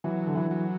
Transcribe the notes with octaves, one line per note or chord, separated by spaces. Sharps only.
E3 F#3
D3
E3
F#3